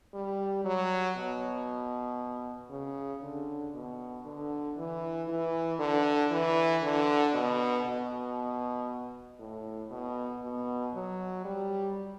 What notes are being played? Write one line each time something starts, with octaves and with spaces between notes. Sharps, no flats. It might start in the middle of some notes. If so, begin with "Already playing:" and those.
G3
F#3
B2
C#3
D3
B2
D3
E3
E3
D3
E3
D3
B2
B2
A2
B2
B2
F#3
G3